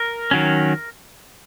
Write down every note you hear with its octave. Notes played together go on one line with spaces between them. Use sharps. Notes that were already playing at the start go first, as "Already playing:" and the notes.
Already playing: A#4
D#3 F#3 C#4